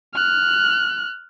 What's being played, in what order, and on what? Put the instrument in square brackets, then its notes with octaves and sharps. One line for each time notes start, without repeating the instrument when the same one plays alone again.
[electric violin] F6 F#6